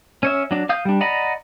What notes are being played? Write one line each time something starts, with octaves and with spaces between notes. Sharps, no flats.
C#4 C#5 E5
F#3 D4
F5 D#6 G6
G3 D4
D5 D#5 F#5 A#5 B5